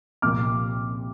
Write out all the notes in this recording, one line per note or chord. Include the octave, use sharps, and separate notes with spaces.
C2 A#2 F3 A#3 D6 F6